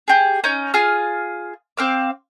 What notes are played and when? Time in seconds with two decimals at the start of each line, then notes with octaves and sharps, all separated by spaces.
0.08 G4 G#4
0.44 C#4 D#4 G6
0.74 F4 G#4 F6
1.77 C4 F5 D6